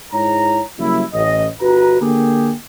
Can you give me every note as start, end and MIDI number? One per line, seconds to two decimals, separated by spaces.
0.13 0.60 44
0.13 0.60 56
0.13 0.60 64
0.13 0.60 73
0.13 0.60 82
0.79 1.03 49
0.79 1.03 54
0.79 1.03 55
0.79 1.03 58
0.79 1.03 64
1.14 1.47 33
1.14 1.47 75
1.60 1.98 31
1.60 1.98 66
1.60 1.98 71
1.60 1.98 82
2.00 2.52 50
2.00 2.52 58
2.00 2.52 67
2.00 2.52 68